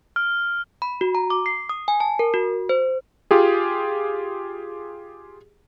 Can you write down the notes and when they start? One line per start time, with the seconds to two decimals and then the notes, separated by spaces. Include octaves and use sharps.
0.16 F6
0.82 B5
1.01 F#4
1.15 A#5
1.30 D6
1.46 C7
1.69 D#6
1.88 G#5
2.00 A5
2.19 A#4
2.34 F#4
2.69 C5
3.31 F4 G4 G#4